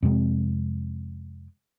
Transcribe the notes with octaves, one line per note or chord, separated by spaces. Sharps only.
F2 C3 G#3 C4